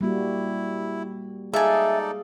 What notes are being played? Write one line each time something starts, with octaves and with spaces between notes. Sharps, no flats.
G3 A#3 E4 F#4
D#4 G#4 A4 D5 E5 F5 G#5